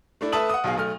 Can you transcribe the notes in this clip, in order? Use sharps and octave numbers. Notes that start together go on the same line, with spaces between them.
A3 D4 E4
A3 B4 E5 A5 D#6 F#7
F#5 D#6
B1 B2 G#4 F5
B1 A3 F6